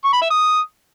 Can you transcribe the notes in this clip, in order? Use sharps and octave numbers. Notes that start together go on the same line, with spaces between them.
C#6
B5
E5
D#6